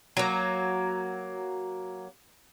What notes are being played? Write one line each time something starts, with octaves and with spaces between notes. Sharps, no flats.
F#3 A#3